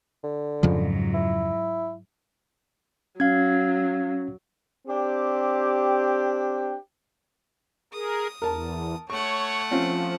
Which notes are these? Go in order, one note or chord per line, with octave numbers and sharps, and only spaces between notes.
D3
F2 G#2 C#3 F3 F#3
E4
F#3 C#4 F5 G#6
C4 D4 G4
G#4 A#4 D#6
E2 A#4 A5
A3 C#5 F#5 C#6
F3 C4 C#4 F4